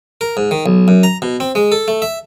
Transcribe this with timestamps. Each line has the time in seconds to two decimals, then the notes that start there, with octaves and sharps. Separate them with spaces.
0.21 A#4
0.37 G#2
0.51 D#3
0.66 B1
0.88 F#2
1.03 A#5
1.22 B2
1.40 C4
1.55 G#3
1.72 A4
1.88 A3
2.02 E5